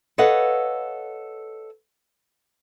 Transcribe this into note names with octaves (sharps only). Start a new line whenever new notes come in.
A4 B4 C#5 D#5 F5 F#5